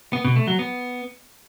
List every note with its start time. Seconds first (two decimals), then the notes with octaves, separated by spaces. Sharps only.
0.13 B3
0.25 B2
0.36 A3
0.47 F#3
0.59 B3